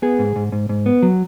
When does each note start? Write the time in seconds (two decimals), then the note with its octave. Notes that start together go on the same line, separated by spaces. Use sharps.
0.02 B3 G#4
0.19 G#2
0.36 G#2
0.52 G#2
0.69 G#2
0.86 B3
1.03 F#3